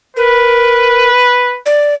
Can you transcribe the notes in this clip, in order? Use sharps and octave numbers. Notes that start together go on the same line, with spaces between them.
A#4 B4
D5